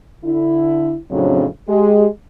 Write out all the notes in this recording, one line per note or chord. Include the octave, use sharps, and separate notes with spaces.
D3 E4
F2 A2 C#3 F#3 C4 D4
G#3 G4